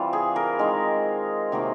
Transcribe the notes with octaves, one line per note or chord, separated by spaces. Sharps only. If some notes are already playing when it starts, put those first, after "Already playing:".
Already playing: E3 G3 C4 F4
G#4
A#4
D#3 G#3 C4
C3 D#3 F#3 A#3